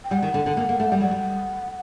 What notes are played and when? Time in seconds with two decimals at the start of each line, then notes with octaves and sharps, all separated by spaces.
0.04 G5
0.11 G3 F#5
0.22 D#3
0.34 D3
0.46 D3
0.57 A#3
0.69 A#3
0.80 A3
0.92 G3
1.01 F#3 F#5
1.11 G3